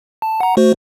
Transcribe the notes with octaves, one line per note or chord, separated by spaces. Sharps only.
A5
F#5 A#5
A3 F#4 C5